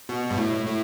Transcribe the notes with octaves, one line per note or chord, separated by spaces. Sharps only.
B2
G2
A2
A2